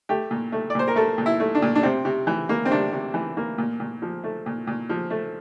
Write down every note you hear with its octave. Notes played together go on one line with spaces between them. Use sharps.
A3 G4
A#2
A3
D5
A#2 C5
A#4
A3 A4
A#2
E4
A3
D4
A#2
D4
C3 C4
C3
E3
A#3
C4
C3 D4
C3
E3
A#3
A#2
A#2
F3
A3
A#2
A#2
F3
A3